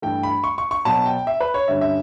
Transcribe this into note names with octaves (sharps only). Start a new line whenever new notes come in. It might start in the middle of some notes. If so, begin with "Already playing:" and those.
G2 E3 A3 G5
B5
C#6
C#6
C#6
B2 F#3 B3 A5
G5
E5
B4
C#5
G2 D3 G3 C#4 E5
E5